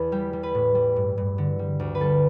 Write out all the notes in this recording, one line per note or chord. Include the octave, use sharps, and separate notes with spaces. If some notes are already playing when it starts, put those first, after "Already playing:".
Already playing: E2 A4 B4
G3 G4
G3
B4
A2
G3
G2
G2
D3
G3
D2
B4
G3 A4